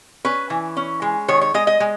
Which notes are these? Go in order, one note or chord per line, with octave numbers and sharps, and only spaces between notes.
C#4 B4
E3
C#4
G#3
D#3 C#5
C#5
G#3 D#5
D#5
G#3